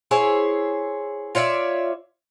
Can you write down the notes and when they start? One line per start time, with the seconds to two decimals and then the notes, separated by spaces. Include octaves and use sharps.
0.11 E4 G#4 C5 C#5
1.35 F4 C#5 D5 E5